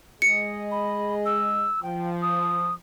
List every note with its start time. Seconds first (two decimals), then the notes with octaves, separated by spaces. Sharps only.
0.22 G#3 G#4 D#5 C#7
0.71 B5
1.25 E6
1.83 F3 G5
2.22 D#6